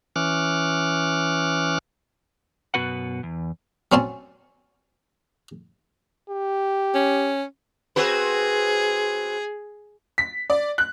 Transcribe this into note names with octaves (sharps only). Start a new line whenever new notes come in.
E3 C#4 D6 F6 F#6
F#2 B2 B3 F#4 B4 F#5
E2
F#3 C4 C#4 A5
G4
C#4
C4 F#4 G#4 B4
B6
D5
F#6